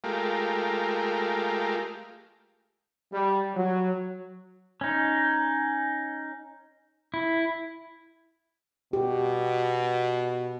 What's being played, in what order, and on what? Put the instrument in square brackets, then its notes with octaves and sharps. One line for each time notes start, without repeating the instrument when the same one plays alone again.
[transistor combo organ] G#3 A3 F4 G4 A#4
[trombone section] G3
F#3
[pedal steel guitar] C#4 D#4
E4
[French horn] B2 [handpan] G4